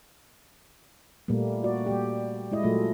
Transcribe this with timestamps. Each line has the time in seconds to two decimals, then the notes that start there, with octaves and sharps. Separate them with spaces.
1.28 A#2 G3 A3 A#3
1.64 F#4 D5
1.87 G3 G4
2.52 G#3 E4 D#5
2.63 A#2 F#3 A3 F4